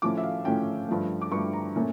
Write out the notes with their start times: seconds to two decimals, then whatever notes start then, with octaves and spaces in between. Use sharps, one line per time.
0.02 A2 F3 A3 C#4 D6
0.18 E5
0.24 F5
0.45 A2 F3 A3 C#4 G5
0.88 G2 F3 A3
1.21 D6
1.32 G2 F3 A3 C#6
1.53 A#5
1.76 A#2 A3 C#4